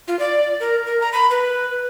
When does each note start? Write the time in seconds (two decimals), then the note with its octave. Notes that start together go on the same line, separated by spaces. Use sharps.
0.08 F4
0.19 D5
0.60 A#4
0.86 A#4
1.01 A#5
1.13 B5
1.30 B4